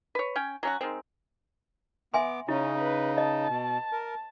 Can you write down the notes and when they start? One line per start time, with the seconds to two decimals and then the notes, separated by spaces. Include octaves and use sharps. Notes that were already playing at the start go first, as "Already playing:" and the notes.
0.15 B4 C#5
0.36 C#4 G5 G#5
0.63 F#3 C#4 F#4
0.81 D#3 G#3 C4
2.14 B3 E5 G#5 C6 D6
2.48 C#3 C#4 D#4 E4
2.79 B4
3.18 D#5 A5
3.49 B2
3.92 A#4